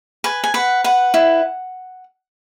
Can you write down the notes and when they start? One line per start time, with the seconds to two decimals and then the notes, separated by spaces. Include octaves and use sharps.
0.24 B4 G#5
0.44 G#5
0.54 B4 F#5
0.84 B4 F#5
1.14 E4